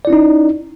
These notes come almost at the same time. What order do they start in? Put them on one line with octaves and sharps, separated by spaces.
D5 E4 C#4 D#4